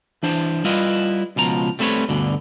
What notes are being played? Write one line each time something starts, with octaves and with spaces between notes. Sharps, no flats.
E3 D4 C5
G3 E4 F4 B4 D#5
C#2 B2 F3 A#5
G3 A3 C4 E4 B4 C#5
D2 G2 B2 D3